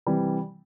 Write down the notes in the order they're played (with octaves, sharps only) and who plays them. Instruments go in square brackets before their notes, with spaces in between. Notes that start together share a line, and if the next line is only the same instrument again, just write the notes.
[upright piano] C3 E3 G3